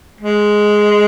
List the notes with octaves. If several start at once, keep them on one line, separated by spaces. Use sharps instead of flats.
G#3